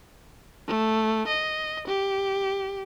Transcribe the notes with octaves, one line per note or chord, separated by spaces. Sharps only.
A3
D#5
G4